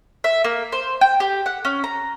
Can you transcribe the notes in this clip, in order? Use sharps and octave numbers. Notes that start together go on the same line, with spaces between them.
E5
A#3
C5
G5
G4
F#5
C#4
A#5